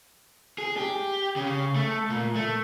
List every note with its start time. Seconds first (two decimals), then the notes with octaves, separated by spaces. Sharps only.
0.58 G#4
0.77 G4
1.36 C#3
1.76 A3
2.10 A#2
2.35 A3